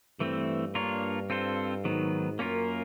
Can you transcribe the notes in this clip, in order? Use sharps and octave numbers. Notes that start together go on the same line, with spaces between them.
G2 E3 A3 C4
A#3 D4 F4 A#4 C#5
C4 F4 A4 C5
G#2 D#3 F#3 B3
F#2 A#3 C#4 F4 A#4